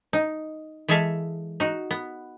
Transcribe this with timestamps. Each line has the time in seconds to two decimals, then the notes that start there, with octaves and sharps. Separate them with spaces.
0.13 D#4
0.88 E3 G#3 G#4 A4 E5 F5
1.60 D#4 F#4
1.91 B3